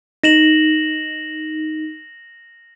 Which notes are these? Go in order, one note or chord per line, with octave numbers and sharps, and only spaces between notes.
D#4 A#6 E7 F#7